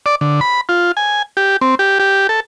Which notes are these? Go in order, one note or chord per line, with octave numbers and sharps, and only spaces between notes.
D5
D3
B5
F4
G#5
G4
C4
G4
G4
A4